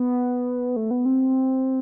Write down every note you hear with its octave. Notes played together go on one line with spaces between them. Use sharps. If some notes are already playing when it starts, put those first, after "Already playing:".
Already playing: B3
A3
B3
C4